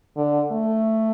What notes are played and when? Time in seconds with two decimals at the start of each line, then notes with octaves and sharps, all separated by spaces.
0.16 D3
0.52 A3